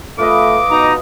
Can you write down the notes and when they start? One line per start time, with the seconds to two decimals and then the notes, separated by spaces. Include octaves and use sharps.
0.18 A3 F4 B4 D#5 D6
0.70 B2 D#4 A#5